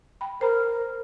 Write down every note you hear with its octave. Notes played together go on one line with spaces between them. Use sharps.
G5 B5
A#4 C5 A#5 B5